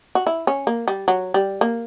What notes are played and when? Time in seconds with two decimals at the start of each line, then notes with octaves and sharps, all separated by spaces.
0.15 F#4
0.27 E4
0.47 C#4
0.67 A#3
0.88 G3
1.08 F#3
1.34 G3
1.61 A#3